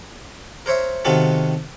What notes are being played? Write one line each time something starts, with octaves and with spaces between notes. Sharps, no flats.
A#4 C5 C#5 E5
C3 D#3 B3 F4 F#4 A4